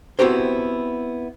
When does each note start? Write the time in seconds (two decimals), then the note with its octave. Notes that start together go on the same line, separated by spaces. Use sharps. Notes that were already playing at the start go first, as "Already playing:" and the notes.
0.19 B3 C4 E4 F#4 G4 C5